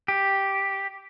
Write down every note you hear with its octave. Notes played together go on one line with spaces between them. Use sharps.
G4